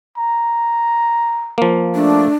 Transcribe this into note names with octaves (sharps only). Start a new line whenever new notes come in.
A#5
F3 A#3
A3 D4